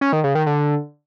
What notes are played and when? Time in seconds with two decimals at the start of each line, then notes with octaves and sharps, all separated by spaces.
0.01 C#4
0.13 D#3
0.24 C#3
0.35 D#3
0.46 D3